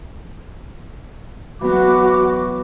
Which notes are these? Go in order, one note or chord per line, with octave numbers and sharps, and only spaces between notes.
E3 F#3 B3 F#4 D6